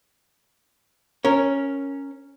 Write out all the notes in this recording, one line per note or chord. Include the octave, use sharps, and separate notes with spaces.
C#4 A#4